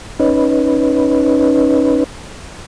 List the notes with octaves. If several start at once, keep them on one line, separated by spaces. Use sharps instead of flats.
C#4 D#4 B4